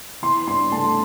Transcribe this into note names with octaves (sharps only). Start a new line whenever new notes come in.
E3 C6
G2 C6
A3 A5